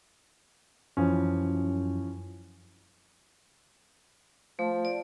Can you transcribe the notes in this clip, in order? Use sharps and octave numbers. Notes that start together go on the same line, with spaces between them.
F#2 E3 F3 C#4
F3 A3
D5